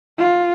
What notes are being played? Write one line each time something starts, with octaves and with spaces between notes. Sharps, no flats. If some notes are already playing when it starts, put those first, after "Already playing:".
F4